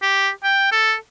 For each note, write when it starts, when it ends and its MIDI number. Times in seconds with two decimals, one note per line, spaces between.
0.02 0.29 67
0.44 0.68 79
0.72 0.94 69